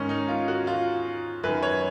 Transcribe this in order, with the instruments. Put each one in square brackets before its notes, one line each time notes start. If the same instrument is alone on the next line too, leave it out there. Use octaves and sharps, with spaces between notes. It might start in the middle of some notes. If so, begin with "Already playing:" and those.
Already playing: [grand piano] G#2 D#3 C#4
D#4
F4
F#4
F4
F#2 D#3 B4
C#5